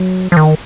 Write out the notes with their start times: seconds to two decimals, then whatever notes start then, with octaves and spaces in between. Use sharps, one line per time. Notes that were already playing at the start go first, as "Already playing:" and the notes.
Already playing: F#3
0.32 F3
0.37 D#3